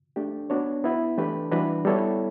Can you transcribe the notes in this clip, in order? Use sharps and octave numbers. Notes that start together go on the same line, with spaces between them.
A3 D4 G4
B3 D4 F#4 C#5
B3 E4 B4
E3 A3 D4 G4 B4
E3 G3 D4 F#4 B4
G3 B3 E4 A4 C#5